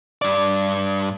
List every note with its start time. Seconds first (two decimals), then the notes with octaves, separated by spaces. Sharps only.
0.22 G2 D5